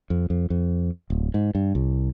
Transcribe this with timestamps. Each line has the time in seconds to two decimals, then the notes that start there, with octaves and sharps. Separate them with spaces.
0.10 F2
0.30 F2
0.50 F2
1.10 D1
1.34 G#2
1.55 G2
1.75 C2